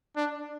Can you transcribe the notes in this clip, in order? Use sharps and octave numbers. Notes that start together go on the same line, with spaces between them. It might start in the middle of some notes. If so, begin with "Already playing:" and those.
D4